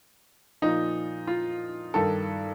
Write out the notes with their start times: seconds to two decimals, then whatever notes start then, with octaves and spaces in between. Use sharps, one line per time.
0.62 A#2 F3 D#4
1.27 F4
1.94 G2 D#3 A4